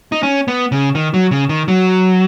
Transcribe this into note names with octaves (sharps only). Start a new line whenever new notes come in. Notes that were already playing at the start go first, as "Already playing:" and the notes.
D#4
C#4
B3
C#3
D#3
F#3
C#3
D#3
F#3